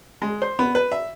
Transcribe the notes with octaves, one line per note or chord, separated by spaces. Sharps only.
G#3
C5
B3
B4
E5